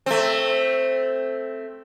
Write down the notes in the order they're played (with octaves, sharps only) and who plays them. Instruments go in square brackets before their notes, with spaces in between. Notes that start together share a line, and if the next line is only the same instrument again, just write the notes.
[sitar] A3 C4